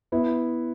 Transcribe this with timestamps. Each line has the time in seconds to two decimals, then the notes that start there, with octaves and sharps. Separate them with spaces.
0.12 B3 E4